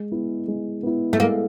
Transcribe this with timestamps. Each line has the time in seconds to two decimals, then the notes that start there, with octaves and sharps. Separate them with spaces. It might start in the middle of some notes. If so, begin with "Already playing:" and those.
Already playing: G#3
0.12 B3 E4
0.48 G#3
0.83 B3 E4
1.13 A3
1.20 G#3 A#3